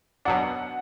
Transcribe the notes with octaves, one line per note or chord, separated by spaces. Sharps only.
B2 F#3 D4 F#5